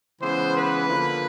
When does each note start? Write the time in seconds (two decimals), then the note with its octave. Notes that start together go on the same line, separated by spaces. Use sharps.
0.22 C#3 E3 G#3 B3 C5
0.55 B4
0.88 D3 F3 A#3